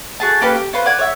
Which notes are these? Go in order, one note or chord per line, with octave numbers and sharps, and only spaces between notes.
F#4 G#4 A5
A#3 C#4 G4 B4
G4
C#4 F4 B4 C5
D5 F#5 G#5
C#5 D5 E5 F#5